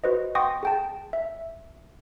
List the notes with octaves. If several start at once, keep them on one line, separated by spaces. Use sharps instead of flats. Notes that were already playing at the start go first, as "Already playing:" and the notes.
F#4 B4 C5 D#5
F#5 G5 C6 C#6 D#6 A#6
G#4 G5 A5
E5